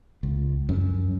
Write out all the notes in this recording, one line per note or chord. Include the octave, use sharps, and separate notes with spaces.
C#2
F#2